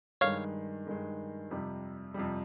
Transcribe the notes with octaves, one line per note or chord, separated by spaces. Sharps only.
G2 D#3 G#3 C#5 F5
G2 D#3 G#3
F2 C3 G3
F2 C3 G3